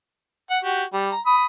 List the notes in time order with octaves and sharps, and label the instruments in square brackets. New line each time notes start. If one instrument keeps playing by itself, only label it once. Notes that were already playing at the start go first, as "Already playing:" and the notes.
[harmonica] F#5
F#4 G4
G3
A#5
B5 D#6